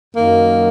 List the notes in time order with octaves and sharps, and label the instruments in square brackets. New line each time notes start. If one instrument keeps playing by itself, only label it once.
[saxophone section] F#2 D#3 F#3 A#3